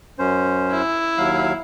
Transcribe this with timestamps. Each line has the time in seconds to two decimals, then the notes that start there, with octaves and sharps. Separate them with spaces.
0.19 F#2 C#4 C5
0.72 E4
1.18 D#2 F#3 F5